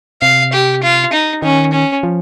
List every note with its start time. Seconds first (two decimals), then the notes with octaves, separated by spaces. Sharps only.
0.22 C3 F5
0.53 G4
0.83 F4
1.13 D#4
1.42 D#3 C#4
1.73 C#4
2.03 F3